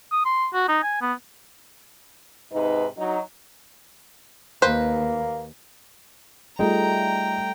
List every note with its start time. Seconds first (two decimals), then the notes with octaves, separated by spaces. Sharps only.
0.12 D#6
0.25 C6
0.54 F#4
0.68 D#4
0.83 G#5
1.01 B3
2.52 G#2 C3 D#4 B4
2.98 F#3 D#4
4.62 D#2 A#3 B4 C5
6.59 G3 A3 D#4 F4 G#4 G5 A#5